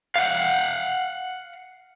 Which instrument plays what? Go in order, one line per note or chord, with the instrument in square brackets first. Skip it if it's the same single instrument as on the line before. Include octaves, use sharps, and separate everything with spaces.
[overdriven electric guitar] F5 F#5